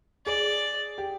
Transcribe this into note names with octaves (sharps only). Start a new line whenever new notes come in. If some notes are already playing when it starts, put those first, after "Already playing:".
G#4 D5
G4